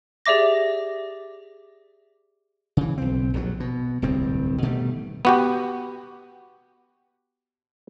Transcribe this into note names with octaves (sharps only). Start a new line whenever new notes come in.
G4 G#4 D5 E5 D6 A#6
C#3 E3
B1 C4
A#1 D#2 F#3
B2
D1 C2 G2 C4
B2 D#3 G3 A3
B3 F#4 G4